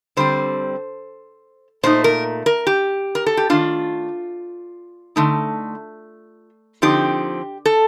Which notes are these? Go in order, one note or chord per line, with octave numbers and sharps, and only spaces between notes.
D3 G3 C4 C5
A#2 A3 D#4 C5
A#4
A#4
G4
A#4
A4
G4
D#3 A3 D4 F4
D3 A3 D#4
D3 F3 C4 D#4 G4
A4